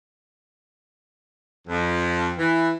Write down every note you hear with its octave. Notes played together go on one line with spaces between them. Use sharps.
F2
E3